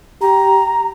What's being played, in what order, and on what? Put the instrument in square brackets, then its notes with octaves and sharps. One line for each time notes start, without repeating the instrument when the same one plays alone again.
[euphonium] G4 [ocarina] A#5